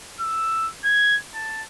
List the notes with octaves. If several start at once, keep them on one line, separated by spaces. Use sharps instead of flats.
E6
G#6
A5